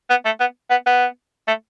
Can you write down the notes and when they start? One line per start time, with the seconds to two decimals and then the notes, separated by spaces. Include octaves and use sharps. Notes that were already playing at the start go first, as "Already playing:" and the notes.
0.10 B3
0.25 A3
0.40 B3
0.70 B3
0.86 B3
1.48 A3